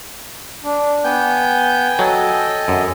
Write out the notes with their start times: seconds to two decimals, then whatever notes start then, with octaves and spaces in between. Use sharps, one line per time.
0.64 D4
1.04 B3 G5 G#5 G6
1.99 F#3 A4 D#5
2.68 F#2